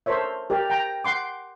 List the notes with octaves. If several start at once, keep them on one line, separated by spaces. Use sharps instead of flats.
A4 A#4 C5 C#5 E5
G4 A#4 D5
G5 A#5
F#5 C6 D6